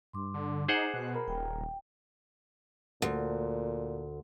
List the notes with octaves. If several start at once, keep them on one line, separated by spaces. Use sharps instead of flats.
G2 C6 D6
D3
D#4 G#4 C5 F#5
B2 F#6
A#4 B5
D#1 G5
D2 A#2